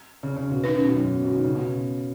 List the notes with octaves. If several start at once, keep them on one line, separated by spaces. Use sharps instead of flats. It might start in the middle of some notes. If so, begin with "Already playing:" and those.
C#3
C#3
B2
D#3 C#4 B4
D#3
B2
F#2
G#2
B2
D#3
C#3
B2